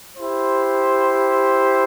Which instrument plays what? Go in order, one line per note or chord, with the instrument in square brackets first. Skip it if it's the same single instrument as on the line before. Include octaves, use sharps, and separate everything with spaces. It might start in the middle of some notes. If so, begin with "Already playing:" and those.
[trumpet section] E4 G4 C5